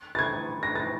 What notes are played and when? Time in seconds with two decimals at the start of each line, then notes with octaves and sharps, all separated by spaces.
0.15 A6
0.19 G#6
0.63 A#6
0.76 A6